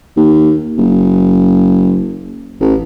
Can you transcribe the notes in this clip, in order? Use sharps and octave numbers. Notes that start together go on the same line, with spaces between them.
D#2
F#1
A1